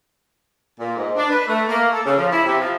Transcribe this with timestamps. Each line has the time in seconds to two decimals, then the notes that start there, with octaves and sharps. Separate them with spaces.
0.80 A#2
0.96 G#2
1.16 D4
1.30 B4
1.47 A3
1.69 A#3
1.92 A4
2.05 C#3
2.17 F3
2.32 E4
2.45 C3
2.59 F3